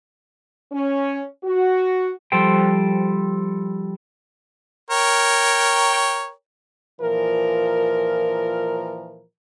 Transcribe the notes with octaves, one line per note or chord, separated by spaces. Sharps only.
C#4
F#4
F3 G3 A4 C5 G5
A#4 C#5 G5
A#2 E3 F3 A#4